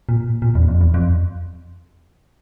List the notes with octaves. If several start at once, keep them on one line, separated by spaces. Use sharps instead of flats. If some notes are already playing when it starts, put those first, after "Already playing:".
A#2
A#2
E2
F2
E2
F2